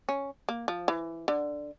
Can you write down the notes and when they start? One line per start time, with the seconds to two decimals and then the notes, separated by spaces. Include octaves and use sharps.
0.09 C#4
0.49 A#3
0.68 F3
0.88 E3
1.28 D3